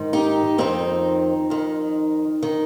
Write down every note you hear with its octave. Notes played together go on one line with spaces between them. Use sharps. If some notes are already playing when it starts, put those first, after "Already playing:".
Already playing: G#2 D#3
D#4 G4
F2 D#3 C4 D#4
F2 D#3
D#3